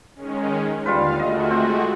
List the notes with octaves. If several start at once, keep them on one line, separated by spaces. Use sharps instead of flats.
D#3 G#3 C#4
D#2 D3 G3 F4 B4 F5
G#3 A3 F#4 D#5
C4